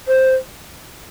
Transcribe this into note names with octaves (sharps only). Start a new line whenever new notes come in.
C5